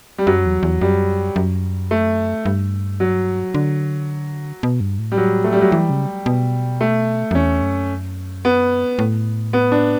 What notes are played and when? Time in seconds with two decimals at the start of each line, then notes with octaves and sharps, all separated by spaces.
0.18 G3
0.27 F#2 F#3
0.46 E2
0.63 E2
0.81 F#2 G3
1.36 F#2
1.91 A3
2.46 G2
3.00 F#3
3.54 D3
4.63 B2
4.80 G2
4.99 A2
5.12 G3
5.17 F#3
5.44 A3
5.53 G3
5.61 F#3
5.70 E3 G3
5.90 C#3
6.26 B2
6.81 A3
7.31 F#2
7.35 E2 C#4
7.62 F#2
8.45 B3
8.99 A2
9.53 B3
9.72 D4